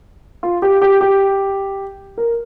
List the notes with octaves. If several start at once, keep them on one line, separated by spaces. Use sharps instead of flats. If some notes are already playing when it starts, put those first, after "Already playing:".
F4
G4
G4
G4
A#4